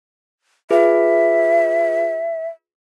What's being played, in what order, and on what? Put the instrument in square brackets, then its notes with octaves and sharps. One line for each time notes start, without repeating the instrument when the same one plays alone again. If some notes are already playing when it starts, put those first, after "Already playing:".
[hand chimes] F4 G#4 B4 [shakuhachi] E5